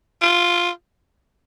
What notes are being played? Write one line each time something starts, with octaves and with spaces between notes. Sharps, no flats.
F4